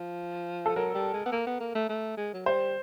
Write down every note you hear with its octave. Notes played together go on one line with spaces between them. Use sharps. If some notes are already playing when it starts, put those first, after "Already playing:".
Already playing: F3
A4
F#3 A#4
G3
G#3
B3
A#3
B3
A#3
A3
A3
G#3
F#3
G3 C5